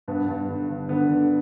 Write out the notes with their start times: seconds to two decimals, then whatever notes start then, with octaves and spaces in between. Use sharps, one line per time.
0.08 G2 B3
0.28 G2
0.49 D3
0.69 G2
0.89 D3 B3
1.09 D3